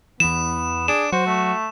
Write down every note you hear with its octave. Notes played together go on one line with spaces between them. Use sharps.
E2 E3 B3 E7
D4 G#4 E7
F#3 F#4 C5
A3